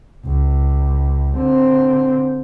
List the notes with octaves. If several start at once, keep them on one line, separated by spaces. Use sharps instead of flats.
C#2
D3 C4